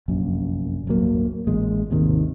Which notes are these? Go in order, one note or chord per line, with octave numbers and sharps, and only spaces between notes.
F1 A#1 F#2
D1 G1 F#3 A#3
A1 A#2 G#3
G#1 D#2 C3 D#3